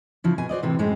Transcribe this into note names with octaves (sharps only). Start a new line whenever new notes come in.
C#3 F3 E4
B2 G#5
F#4 C5 D5 D#5
A2 C3 E3
F#2 A2 G#3 C4